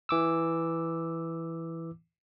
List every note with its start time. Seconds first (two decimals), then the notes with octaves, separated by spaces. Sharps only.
0.09 E3 D6 E6